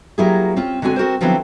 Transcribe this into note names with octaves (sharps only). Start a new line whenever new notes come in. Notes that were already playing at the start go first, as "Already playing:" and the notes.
F#3 A#3 E4 G4 G#4
C4 C#4 F4
D3 G#3 C4 F#4 G#5
C4 F#4 A#4 C5
D3 F3 F#3 B3 C4 E4